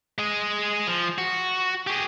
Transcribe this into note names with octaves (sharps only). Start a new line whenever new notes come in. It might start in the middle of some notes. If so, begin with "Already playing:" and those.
G#3 G#4
F3
F#4
G4 G#4